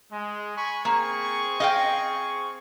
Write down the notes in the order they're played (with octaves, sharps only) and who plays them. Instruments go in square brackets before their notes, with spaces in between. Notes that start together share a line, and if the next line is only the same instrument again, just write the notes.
[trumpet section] G#3
G#5 B5 C#6
[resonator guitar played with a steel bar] A#3 [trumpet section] C4 G#4 C#6
[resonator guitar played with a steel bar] D#5 F5 G5